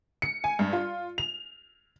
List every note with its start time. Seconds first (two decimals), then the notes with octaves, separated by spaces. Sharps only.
0.22 C#7
0.44 G#5
0.59 G2
0.73 F4
1.18 F7